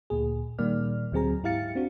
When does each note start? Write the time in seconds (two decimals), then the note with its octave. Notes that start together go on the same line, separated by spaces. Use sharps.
0.10 D2 A#2 G#4
0.58 A#2 D#3 G3 A#3 D5 F6
1.12 D2 F#3 C4 G#4 A#5
1.43 G#2 E4 G4 F5 A6 C#7
1.75 C4 D4 F#4